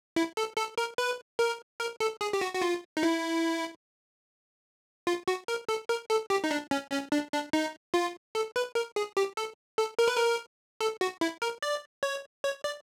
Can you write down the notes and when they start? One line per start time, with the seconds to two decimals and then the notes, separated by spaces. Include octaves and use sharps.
0.16 E4
0.37 A4
0.57 A4
0.78 A#4
0.98 B4
1.39 A#4
1.80 A#4
2.00 A4
2.21 G#4
2.33 G4
2.41 F#4
2.55 F#4
2.62 F4
2.97 D#4
3.03 E4
5.07 F4
5.28 F#4
5.48 A#4
5.69 A4
5.89 A#4
6.10 A4
6.30 G4
6.44 D#4
6.51 D4
6.71 C#4
6.92 C#4
7.12 D4
7.33 D4
7.53 D#4
7.94 F4
8.35 A4
8.56 B4
8.75 A#4
8.96 G#4
9.17 G4
9.37 A4
9.78 A4
9.99 A#4
10.08 B4
10.17 A#4
10.81 A4
11.01 F#4
11.21 E4
11.42 A#4
11.62 D5
12.03 C#5
12.44 C#5
12.64 D5